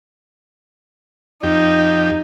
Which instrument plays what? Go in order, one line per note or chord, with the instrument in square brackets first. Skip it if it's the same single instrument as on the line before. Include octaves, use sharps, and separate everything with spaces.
[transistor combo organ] F2 G4 [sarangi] D#4